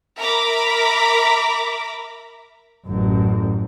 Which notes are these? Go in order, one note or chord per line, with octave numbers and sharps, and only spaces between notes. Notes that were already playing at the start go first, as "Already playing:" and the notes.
A#4 E5 A#5 B5 D6
A1 F#2